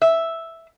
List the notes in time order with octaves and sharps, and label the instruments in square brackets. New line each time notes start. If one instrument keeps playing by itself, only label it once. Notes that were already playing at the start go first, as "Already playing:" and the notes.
[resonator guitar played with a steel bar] E5